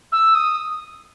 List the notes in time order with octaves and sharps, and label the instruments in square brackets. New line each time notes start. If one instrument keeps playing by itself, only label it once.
[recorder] E6
D#6